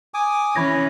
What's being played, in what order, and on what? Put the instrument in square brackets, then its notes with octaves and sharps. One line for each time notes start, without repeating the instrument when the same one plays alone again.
[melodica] G#5 D6 D#6
[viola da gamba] E3 C#4 [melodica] C#5 [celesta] B5 G#6 A#6